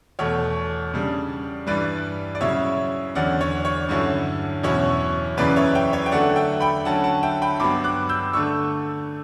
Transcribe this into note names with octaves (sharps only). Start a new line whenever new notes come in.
E2 B2 A3 C#5
C#3 G3 D4
G2 E3 G3 B4 D5
D5
C#3 F#3 C#4 E4 C#5 E5
E2 D3 F#3 C#4 D5 F#5
C#5
C#5
G2 D3 F#3 C#4 E4
E2 B2 F#3 C#4 E4 C#5
F#2 C#3 E3 B4 D5
C#5 E5
E5 G5
C#5 E5
G5
D3 F#3 A3 D4 D5 F#5
E5 G5
G5 B5
D3 F#3 C#4 F#5 A5
F#5 A5
E5 G5
G5 B5
G2 F#3 B3 B5 D6
D6 F#6
E6 G6
D3 A3 D4 C#6 E6